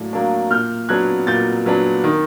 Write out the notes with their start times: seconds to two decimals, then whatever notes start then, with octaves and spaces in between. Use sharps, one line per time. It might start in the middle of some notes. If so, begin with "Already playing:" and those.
Already playing: A2 F#3 A#3 D4
0.13 F#3 A#3 D4
0.51 A#2 F6 G6
0.89 F#3 B3 D4 F#6 G#6
1.27 A#2 G6 A6
1.66 F#3 B3 D4
2.04 D#3